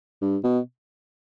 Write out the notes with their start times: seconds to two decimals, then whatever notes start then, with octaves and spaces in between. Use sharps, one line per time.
0.22 G2
0.44 B2